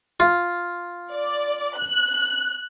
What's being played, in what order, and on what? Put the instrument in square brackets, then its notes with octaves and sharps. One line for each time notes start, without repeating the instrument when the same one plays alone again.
[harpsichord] F4
[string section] D5
F#6